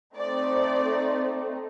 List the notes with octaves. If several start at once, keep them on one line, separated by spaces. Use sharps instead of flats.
A3 C4 D#4 D5